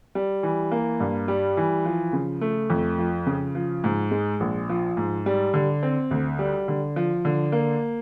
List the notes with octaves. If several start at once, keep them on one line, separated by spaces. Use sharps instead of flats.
G3
E3
A#3
G2
G3
E3
F3
C#3
A3
F2
F3
C#3
F3
G#2
G#3
A#1
F3
G#2
G3
D3
C4
D2
G3
D3
F3
D3
A#3